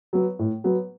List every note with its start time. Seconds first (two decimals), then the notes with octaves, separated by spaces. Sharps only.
0.13 F#3 B3
0.39 A2
0.64 F#3 B3